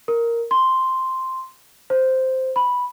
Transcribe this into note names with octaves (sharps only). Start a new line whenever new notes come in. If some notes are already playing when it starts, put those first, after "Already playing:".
A#4
C6
C5
B5